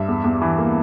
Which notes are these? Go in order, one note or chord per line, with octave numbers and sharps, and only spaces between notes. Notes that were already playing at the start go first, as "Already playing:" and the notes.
Already playing: G2 E5
E2
E2
E3
A#3